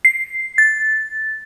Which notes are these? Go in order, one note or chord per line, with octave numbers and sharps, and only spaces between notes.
C7
A6